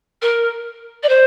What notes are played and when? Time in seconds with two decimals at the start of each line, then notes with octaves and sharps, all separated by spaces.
0.22 A#4
1.03 D5
1.09 C5